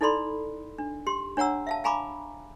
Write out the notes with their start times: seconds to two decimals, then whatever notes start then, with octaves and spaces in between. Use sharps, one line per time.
0.01 D#4 E4 A4 D5 B5 C6
0.78 D4
1.07 G4 C6
1.37 D4 C#5 F#5 A#5 E6
1.67 E5 F5 A5
1.84 F5 G#5 A#5 B5 C#6 D6